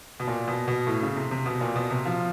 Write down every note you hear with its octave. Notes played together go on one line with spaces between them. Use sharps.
B2
A#2
B2
B2
A2
C#3
C3
C3
B2
A#2
B2
C3
F3